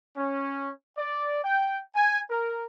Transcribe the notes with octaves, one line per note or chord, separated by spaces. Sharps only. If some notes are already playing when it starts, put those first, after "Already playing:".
C#4
D5
G5
G#5
A#4